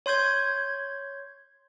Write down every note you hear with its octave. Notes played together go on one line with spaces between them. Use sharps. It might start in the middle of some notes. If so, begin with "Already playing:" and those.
C#5 C6 G6 G#6